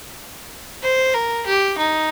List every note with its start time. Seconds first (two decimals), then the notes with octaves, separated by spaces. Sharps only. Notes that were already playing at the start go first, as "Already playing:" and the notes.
0.83 C5
1.14 A#4
1.46 G4
1.78 D#4